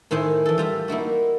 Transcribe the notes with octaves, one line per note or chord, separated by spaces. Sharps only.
A2 D#3 E4 C5 G#5
E3 A4
G3 F4 E5
A#3 D#4 E4 F#4